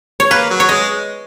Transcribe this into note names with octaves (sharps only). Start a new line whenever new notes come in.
C#5
A#3 B4
F#3
C#5
G#3 D#5